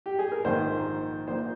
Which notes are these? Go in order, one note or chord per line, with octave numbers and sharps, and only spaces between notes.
G4
G#4
A#4
A#1 G#2 D#3 C5
A#1 A#2 C5